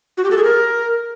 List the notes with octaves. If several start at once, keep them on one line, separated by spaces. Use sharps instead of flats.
F#4
G4
A4
G#4
A#4